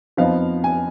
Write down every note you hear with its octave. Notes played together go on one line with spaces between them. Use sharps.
F2 F3 B3 D#4 F5
G#5